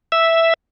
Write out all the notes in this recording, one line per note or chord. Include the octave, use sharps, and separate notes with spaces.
E5